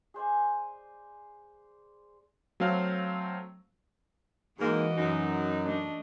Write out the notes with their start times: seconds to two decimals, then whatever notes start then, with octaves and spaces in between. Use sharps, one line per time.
0.14 G#4 C5 D5 G#5
2.60 F#3 A3 C4 F5
4.60 G#2 E3 A#3 F#4 D#5
4.97 F#2 D#4
5.65 A3 D4 D#5